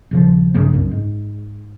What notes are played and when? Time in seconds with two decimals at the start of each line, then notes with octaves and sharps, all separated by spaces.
0.11 D#1 C#3 F3
0.54 A#1 G2 C#3 A#3
0.73 C2 F#2
0.91 G#2